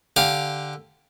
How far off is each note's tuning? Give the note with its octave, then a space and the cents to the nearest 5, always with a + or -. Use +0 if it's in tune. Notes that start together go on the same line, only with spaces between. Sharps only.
D3 +0 G4 +0 F5 +0